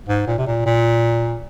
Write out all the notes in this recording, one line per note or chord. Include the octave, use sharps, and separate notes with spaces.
G#2
A#2
C3
A#2
A#2